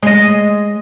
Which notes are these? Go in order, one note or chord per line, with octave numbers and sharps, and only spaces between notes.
G#3 D#5